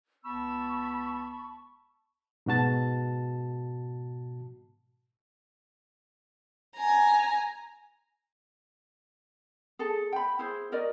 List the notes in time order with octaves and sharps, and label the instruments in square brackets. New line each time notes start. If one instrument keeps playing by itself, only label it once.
[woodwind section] C#2 B3 E6 [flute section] A5 B5 C#6
[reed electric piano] G#2 B2 F#4 A5 A6
[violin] G#5 A#5
[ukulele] G#4 A4 A5
G5 B5
E4 G#4 C5
F#4 A#4 D5 D#5